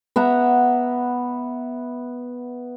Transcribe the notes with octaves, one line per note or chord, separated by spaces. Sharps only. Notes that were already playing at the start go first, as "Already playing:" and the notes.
B3 E5 F#5 A#5